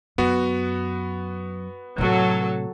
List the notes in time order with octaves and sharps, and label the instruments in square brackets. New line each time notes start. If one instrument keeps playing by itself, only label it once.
[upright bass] F#2 [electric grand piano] B3 F#4
[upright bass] A2 C3 [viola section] F#3 A4